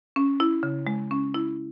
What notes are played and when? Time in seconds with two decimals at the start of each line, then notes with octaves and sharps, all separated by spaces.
0.16 C#4
0.40 E4
0.63 C#3
0.87 G#3
1.11 C#4
1.34 E4